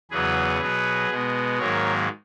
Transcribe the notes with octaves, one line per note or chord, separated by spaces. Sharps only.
E2 C#3 F#3 B3 G#4 B4
B2 F#3 B3
B2 G#3 B3
G#2 D#3 F#3 A#3 A#4 C#5